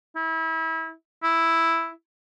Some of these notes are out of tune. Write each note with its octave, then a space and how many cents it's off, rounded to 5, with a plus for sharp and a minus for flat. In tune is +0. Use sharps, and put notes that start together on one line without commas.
E4 -30
E4 +0